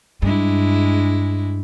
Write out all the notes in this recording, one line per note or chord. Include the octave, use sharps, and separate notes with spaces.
G2 G#3 D4 E4